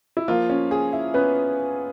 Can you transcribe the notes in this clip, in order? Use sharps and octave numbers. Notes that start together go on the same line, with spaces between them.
E4
F3 A#3 F4
C#4
G#4
E4
B3 C#4 B4